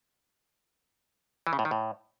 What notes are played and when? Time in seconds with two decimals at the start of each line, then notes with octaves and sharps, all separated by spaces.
1.47 E3
1.53 C#3
1.59 A2
1.65 D#3
1.71 A2